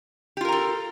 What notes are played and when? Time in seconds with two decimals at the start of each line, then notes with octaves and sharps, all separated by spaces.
0.37 G4
0.41 F4
0.45 A#4
0.49 A#5
0.52 A4